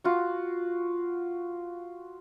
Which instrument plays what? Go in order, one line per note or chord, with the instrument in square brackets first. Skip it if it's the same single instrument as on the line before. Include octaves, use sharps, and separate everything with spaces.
[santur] F4 F#4